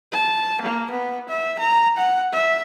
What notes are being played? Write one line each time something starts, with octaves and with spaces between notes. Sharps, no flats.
A5
A#3
B3
E5
A#5
F#5
E5